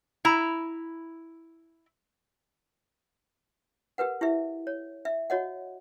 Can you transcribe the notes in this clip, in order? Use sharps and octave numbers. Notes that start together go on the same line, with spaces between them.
E4 A#5
G4 A#4 B4 F#5
E4 G4 E5
C#5
E5
F#4 C#5 D#5 F#5